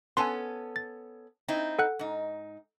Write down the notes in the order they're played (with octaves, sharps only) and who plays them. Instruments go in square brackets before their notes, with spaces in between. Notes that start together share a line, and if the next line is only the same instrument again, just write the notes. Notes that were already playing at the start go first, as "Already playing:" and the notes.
[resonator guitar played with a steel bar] B3 C#4 A4 [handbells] G#5 A5 C6
[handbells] A6
[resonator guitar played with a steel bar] C4 D#4 E4
[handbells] A4 F#5 F#6
[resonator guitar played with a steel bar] G#2 D#4